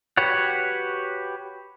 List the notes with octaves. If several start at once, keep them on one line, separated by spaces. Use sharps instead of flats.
F#4 G4 B4 C#5 F#5